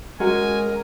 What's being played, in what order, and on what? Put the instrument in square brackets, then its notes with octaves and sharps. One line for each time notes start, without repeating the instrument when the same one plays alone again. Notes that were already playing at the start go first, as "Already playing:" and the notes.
[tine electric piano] G#3 [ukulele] C#4 F#4 F#5 [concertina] A#4 [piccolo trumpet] G#5